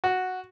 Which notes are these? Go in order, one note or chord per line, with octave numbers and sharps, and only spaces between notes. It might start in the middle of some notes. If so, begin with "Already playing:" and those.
F#4